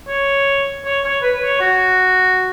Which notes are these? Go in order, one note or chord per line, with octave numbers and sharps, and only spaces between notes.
C#5
C#5
C#5
B4
C#5
F#4